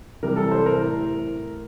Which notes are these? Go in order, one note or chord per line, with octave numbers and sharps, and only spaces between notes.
C3 E3 G3 A#4
A4
C5
A#4
A2